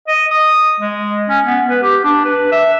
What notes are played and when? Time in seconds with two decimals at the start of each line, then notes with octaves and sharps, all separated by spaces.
0.08 D#5
0.31 D#6
0.80 G#3
1.29 C#4
1.45 B3
1.69 B4
1.83 G4
2.04 D4
2.25 B4
2.52 E5